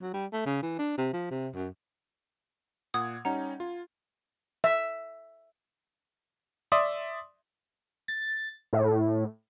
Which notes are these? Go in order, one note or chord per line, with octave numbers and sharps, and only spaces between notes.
F#3
G3
A3
C#3
E3
D4
C3
F3
C3
F#2
A#2 F#5 D#6 G#6
G3 C#4 D#4 F#5 A#5
F4
E5
D5 E5 C6 D#6
A6
A2